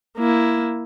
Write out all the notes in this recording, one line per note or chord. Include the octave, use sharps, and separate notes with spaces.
A#3 E4